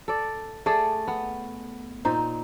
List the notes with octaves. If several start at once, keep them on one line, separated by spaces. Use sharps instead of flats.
A4 D5
A3 G#4 A4 D5
B3
A#2 D#4 C5